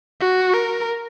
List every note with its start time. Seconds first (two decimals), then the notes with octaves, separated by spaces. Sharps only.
0.20 F#4
0.54 A#4